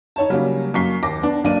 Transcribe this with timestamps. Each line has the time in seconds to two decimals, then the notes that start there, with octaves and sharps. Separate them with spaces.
0.16 D#4 C#5 A5
0.30 C#3 F#3 G3 A#3 C#4
0.74 F#2 A#3 C#6 B6 C7 G7
1.03 D#2 D6 A#6
1.22 B3 D4
1.44 B1 A#3 D4 D5 D#7